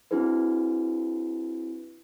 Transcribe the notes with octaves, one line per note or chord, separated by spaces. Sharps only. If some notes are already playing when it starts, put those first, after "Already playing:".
C4 D4 E4 F#4 G#4 B4